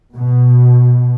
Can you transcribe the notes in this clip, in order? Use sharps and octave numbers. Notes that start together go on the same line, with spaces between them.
B2